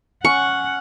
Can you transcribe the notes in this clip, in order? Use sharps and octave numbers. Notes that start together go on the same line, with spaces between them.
C#4 F#5 C#6